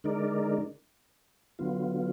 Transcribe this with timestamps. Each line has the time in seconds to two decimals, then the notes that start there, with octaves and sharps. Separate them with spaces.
0.04 D3 G#3 D#4 A#4 D5
1.59 D3 F#3 B3 F4